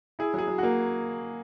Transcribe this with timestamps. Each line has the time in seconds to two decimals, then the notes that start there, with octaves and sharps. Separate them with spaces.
0.19 E4 G#4
0.34 F#3 G#4
0.48 F#3
0.58 A#3 F#4